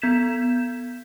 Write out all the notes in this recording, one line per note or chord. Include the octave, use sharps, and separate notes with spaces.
B3 G6 G#6 B6 E7